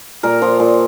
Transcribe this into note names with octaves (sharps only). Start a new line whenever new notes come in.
A#2 A#4
F3
A#2